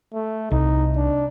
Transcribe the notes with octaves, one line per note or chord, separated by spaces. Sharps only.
A3
C2 D#4
D4